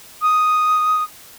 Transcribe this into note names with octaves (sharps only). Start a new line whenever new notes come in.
D#6